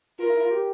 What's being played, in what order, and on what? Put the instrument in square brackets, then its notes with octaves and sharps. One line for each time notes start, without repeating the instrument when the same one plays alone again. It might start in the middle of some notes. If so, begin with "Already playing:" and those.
[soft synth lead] F4 [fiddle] A#4
[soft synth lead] E4
F4
G4